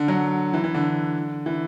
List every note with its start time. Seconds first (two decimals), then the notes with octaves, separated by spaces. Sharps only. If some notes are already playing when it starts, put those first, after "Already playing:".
Already playing: D3
0.08 F#3
0.53 E3
0.64 E3
0.74 D3
1.46 E3